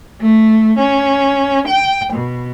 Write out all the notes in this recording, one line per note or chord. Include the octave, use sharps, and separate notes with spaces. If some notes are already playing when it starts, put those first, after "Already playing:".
A3
C#4
G5
B2